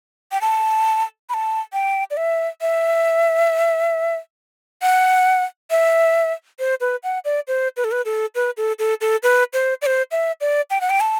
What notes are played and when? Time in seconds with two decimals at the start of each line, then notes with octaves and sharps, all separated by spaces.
0.32 G5
0.41 A5
1.29 B5
1.34 A5
1.73 G5
2.10 D5
2.17 E5
2.61 E5
4.82 F#5
5.70 E5
6.59 C5
6.81 B4
7.03 F#5
7.25 D5
7.48 C5
7.77 B4
7.84 A4
7.92 B4
8.05 A4
8.35 B4
8.57 A4
8.79 A4
9.01 A4
9.23 B4
9.53 C5
9.82 D5
9.86 C5
10.11 E5
10.41 D5
10.70 G5
10.81 F#5
10.90 G5
11.00 A5